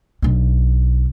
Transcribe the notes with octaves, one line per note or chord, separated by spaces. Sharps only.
B1 D4